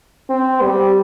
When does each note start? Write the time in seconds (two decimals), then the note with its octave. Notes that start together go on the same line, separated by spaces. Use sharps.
0.30 C4
0.62 G3